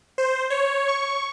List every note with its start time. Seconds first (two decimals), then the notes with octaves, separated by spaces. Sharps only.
0.18 C5
0.50 C#5
0.88 C#6